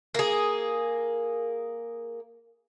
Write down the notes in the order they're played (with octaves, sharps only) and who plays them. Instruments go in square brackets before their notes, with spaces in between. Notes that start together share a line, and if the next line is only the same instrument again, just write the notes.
[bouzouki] A#3 G#4